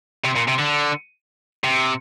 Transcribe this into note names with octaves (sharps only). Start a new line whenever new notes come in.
C3
A#2
C3
D3
C3